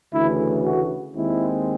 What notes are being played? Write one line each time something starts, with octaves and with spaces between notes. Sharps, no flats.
D2 C#3 E3 A3 E4
F#4
D#2 D#3 G#3 C4 E4